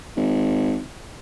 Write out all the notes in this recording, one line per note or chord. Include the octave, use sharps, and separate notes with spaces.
G#1